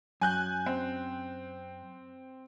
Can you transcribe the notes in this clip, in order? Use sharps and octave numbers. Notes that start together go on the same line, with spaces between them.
F#2 G#5 F#6 G6
C4